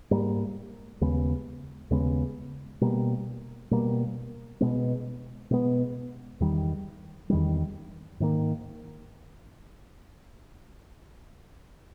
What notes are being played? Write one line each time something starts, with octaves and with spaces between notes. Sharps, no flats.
G#2 G3 A#3
D#2 C#3 G#3 B3
D#2 C#3 G#3 B3
B2 G3 A#3
B2 G3 A#3
B2 G#3 B3
B2 G#3 B3
E2 D#3 G3
E2 D#3 G3
G#2 D#3 A#3